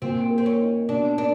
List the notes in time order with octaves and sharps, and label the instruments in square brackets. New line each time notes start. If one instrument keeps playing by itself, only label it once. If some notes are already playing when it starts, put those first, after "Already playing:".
[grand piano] A#2 [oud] C4
[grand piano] A#3
[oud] C4
C#4
[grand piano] D#4
[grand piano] B2 [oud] D4
[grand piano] A#3 [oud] D4